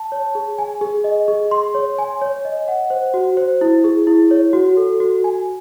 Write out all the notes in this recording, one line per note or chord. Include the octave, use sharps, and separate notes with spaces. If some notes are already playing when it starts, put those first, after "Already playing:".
Already playing: A5
C#5
G#4
G#5
G#4
D#5
G#4
C6
C#5
G#5
C#5
D#5
F#5
C5
F#4
C5
E4
G#4
E4
C#5
F#4
A4
F#4
G#5